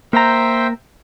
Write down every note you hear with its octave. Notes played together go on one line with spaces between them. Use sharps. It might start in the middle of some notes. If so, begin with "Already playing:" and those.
A#3 C5 E5 G5 A#5